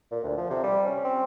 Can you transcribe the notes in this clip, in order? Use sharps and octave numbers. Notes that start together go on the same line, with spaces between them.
A#2
D2
F3
C3
G3
C#4
C4